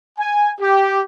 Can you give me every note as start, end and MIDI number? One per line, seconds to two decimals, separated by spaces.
0.19 0.51 80
0.60 1.00 67